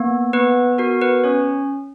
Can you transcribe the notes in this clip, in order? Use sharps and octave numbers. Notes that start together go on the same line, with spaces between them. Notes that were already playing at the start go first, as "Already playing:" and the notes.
Already playing: A#3 B3
B3 B4
F#4 A#4
B4
C#4 C#5